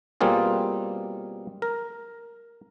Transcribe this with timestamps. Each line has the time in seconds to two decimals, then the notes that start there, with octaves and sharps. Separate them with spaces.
0.21 B2 G3 A#3 C4 F4 G#4
1.62 A#4